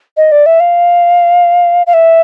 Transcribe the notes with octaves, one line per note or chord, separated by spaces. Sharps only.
D#5
D5
E5
F5
F5
E5